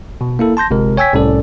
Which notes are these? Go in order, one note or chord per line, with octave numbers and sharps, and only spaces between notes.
B2
A#3 E4 A4
A5 C6 G6 A#6
G1 C3 G#3 A#4
C#5 G5 G#5 E6 G#6 B6
C2 A2 C#4 A4 D5